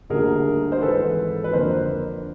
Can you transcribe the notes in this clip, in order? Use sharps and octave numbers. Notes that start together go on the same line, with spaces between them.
D2 D3 G3 A#3 D#4 G#4 A#4
C5
G#1 G#2 E3 A4 B4
B4
F2 D3 F3 A#3 D4 A#4 C5